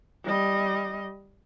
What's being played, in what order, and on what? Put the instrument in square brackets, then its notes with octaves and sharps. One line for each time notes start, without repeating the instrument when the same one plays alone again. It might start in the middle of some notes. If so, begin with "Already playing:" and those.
[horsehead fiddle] G3 D#5